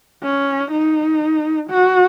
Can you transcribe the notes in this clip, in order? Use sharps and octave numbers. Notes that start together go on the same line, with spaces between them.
C#4
D#4
F#4